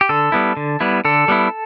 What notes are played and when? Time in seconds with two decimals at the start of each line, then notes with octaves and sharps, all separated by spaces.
0.01 G4
0.09 D3 A4
0.32 G3 B3 E4
0.57 D3
0.80 G3 B3 E4
1.05 D3 A4
1.28 G3 B3 E4